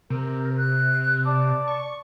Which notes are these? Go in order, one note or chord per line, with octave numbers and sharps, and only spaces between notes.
C3 A#4
F#6
D5 A5 D6
C#6